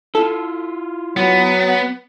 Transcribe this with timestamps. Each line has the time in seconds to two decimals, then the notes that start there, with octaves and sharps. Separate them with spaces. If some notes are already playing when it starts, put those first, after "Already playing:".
0.15 E4 F4 A4
1.17 F#3 B3